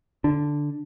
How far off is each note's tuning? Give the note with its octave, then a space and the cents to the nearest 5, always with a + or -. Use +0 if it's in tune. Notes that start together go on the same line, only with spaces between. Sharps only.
D3 +0 D4 +0